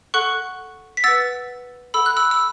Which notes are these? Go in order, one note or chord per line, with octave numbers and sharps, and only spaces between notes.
A4 F#5 C#6 F#6
B6
B4 F#5 E6 A6
A4 F#5 B5 E6
F#6
B5 E6
E6